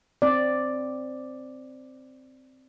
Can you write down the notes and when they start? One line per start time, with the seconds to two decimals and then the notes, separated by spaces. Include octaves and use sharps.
0.22 C4 D5